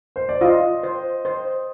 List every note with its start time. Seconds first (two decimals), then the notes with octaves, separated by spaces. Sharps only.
0.16 C5
0.29 D5
0.41 F4 D#5
0.83 C5
1.25 C5